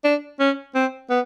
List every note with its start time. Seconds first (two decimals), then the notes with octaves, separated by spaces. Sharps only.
0.04 D4
0.40 C#4
0.75 C4
1.10 B3